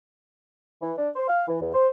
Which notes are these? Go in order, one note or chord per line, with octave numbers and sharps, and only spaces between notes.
E3
D4
C5
F5
E3
E2
C5